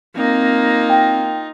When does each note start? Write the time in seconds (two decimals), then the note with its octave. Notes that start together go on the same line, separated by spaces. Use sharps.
0.16 A#3 C4 D#4 F4
0.90 G5